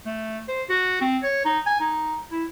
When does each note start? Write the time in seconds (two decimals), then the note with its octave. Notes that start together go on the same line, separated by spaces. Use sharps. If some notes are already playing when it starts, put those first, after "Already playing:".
0.06 A3
0.48 C5
0.69 F#4
1.01 C4
1.23 C#5
1.45 D#4
1.66 G#5
1.80 D#4
2.31 E4